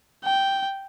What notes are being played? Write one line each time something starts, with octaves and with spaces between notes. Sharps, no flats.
G5